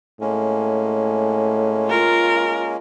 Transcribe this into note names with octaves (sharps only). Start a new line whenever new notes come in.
A2 G#3 A#3 C#4
F4 A#4